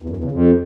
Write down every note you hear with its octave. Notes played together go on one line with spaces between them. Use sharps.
E2
F#2
E2
C#3
F2